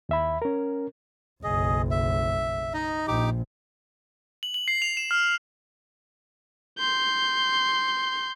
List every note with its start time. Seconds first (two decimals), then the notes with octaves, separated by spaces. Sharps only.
0.09 D#2 E5 B5
0.42 C#4 A#4
1.44 F#1 B1 G#4 D#5
1.91 E5
2.74 D#4 D#5
3.08 A#1 A#2 D#4 G4 D6
4.43 F#7
4.54 F#7
4.68 C7
4.82 F7
4.97 E7
5.11 F6
6.79 C6 G6